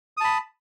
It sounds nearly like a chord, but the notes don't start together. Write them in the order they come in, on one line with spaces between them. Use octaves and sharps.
D#6 A5 B5